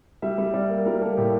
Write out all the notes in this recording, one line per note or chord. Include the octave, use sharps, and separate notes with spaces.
G3 E5
G3
G3 D5
A#3
G3 A#4
A#3 A4
A2 G4